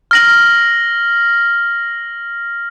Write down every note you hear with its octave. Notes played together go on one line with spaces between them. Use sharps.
F6 A#6 F#7